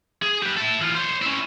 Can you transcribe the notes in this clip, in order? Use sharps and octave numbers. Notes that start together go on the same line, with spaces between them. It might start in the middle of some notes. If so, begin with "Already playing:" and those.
G#4
G4 B4
E4 A4
E3 F4
C5 C#5
C#4 E4